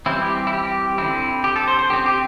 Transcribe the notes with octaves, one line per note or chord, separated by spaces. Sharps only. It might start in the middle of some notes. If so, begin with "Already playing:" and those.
E3 G3 C4 E4
G4
E4
G4
D3 C4 E4
G4
A4
C5
C5
D3 C4 G4
G4